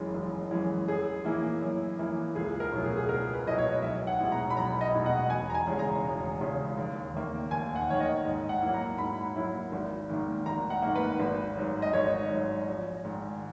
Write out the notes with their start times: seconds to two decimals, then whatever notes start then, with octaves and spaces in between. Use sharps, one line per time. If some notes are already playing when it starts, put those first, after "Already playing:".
Already playing: F#1 F#2 E3 G#3 C#4
0.14 F#1
0.51 F#2 E3 G#3 C#4
0.88 F#2 G#4
1.25 E3 A#3 E4
1.62 F#2
1.98 E3 A#3 E4
2.35 C#2 G#4
2.60 A#4
2.72 B2 F#3 B3 E4
2.84 G#4
2.97 G#4
3.09 C#2 A#4
3.33 B4
3.46 B2 F#3 B3 E4 D#5
3.58 C#5
3.82 B1 E5
4.07 F#5
4.19 B2 G#3 B3 E4
4.32 A#5
4.50 B5
4.56 B1 A#5
4.81 D#5
4.94 B2 G#3 B3 E4
5.06 F#5
5.30 E1 G#5
5.50 A#5
5.55 G#5
5.67 E2 C#3 G#3 C#4
5.79 A#5
6.04 E1
6.41 E2 C#3 G#3 C#4
6.77 D#2
7.14 D#3 A#3
7.51 D#2 G#5
7.76 F#5
7.88 D#3 A#3 C#5
8.00 D#5
8.25 G#2
8.49 F#5
8.62 F#3 A#3 E4
8.74 A#5
8.98 G#2 B5
9.35 F#3 A#3 E4
9.72 G#1
10.09 G#2 D#3 A#3
10.46 G#1 A#5
10.70 F#5
10.82 G#2 D#3 A#3
10.95 B4
11.20 G#1
11.56 G#2 F#3
11.82 D#5
11.93 G#1 C#5
12.30 G#2 F#3
12.68 A#1
13.04 G#2 D#3